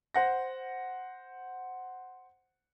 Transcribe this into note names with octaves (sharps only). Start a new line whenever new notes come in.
C5 F#5 A#6